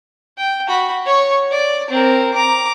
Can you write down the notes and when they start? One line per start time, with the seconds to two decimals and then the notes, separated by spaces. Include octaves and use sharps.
0.38 G5
0.68 F#4 B5
1.06 C#5 C#6
1.51 D5
1.90 C4 A#4
2.34 A#5 D6